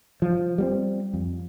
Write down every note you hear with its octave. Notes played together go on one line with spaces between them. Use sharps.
F3
G3 B3 C4
F2